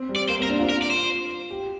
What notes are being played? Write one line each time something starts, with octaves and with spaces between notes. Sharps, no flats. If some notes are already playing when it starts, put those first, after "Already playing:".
Already playing: C4
G3
D5
A#3 C5
C4
A#4
D4
F4
A#4
D5
C5
G4